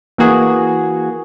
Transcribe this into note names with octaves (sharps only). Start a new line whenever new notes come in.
E3 A#3 F#4 G#4